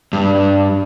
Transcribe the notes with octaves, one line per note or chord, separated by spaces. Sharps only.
G2